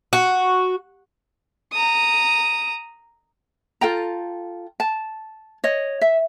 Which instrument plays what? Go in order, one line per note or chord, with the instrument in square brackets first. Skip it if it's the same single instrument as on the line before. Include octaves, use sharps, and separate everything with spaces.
[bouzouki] F#4
[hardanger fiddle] A#5 D#6
[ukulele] F4 A4 G5 A#5
A5
C#5 D#5
E5